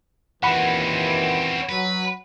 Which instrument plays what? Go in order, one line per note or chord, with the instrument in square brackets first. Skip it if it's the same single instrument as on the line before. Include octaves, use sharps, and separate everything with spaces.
[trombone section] D#2 A#2 E3 [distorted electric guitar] C4 C#4 [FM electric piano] F#5 B5
[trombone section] F#3 [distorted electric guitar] B4